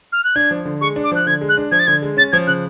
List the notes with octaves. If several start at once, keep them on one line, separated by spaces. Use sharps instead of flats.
F6
F#6
D4 G#6
F3
D3
G#3 C#6
D4
D6
F3 F#6
D3 G#6
G#3
F#6
D4
F3 G#6
A6
D3 G#6
G#3
C#4 A6
F3 G#6
C#3 F#6